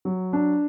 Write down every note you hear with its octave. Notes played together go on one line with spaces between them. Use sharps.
F#3
D4